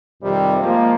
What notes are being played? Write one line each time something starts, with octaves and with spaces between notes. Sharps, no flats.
F2 C3 D#3 G3
F3 G#3 A#3